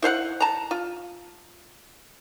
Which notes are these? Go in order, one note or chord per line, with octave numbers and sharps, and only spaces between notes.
E4 C5 F5 F#5
A5 A#5
F4